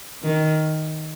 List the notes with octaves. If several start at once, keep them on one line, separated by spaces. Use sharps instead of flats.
D#3